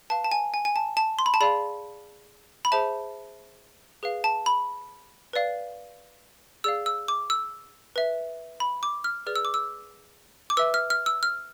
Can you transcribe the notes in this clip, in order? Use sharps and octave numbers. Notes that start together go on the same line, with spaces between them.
B4 F5 A5
A5
G#5
G#5
G#5
A5
A5
C6
B5
A5
G#4 D5 F5 B5
B5
G#4 C5 E5 A5
G#4 B4 F5
A5
B5
B4 D5 F5
G#4 D5 F5 E6
E6
D6
E6
B4 E5
B5
D6
F6
G#4 B4 D5 F6
E6
D6
E6
D6
B4 E5 E6
F6
F6
E6
F6